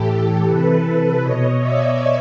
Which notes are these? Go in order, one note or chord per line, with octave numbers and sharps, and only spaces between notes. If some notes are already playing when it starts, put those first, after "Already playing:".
Already playing: A2 E3 G4 A4
C3 E3 A4 B4
B2 C#5 D#5
D5 E5